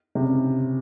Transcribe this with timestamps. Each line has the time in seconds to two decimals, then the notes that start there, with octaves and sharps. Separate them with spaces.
0.15 C3
0.21 C#3